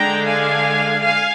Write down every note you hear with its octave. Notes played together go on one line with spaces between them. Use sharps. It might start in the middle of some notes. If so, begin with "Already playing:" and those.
Already playing: D3 G#3 D4 G5 A#5
F5 G#5
F5 G#5